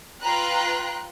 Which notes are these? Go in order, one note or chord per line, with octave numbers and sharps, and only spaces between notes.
F4 B4 G5 A#5 F#6